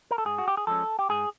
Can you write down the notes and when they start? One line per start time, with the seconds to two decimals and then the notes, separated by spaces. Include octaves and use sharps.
0.11 A#4
0.18 A4
0.25 G#2 G#4
0.38 F#4
0.48 G4
0.57 G#4
0.67 F3 G#3 C#4 A4
0.99 G4
1.09 G#2 G#4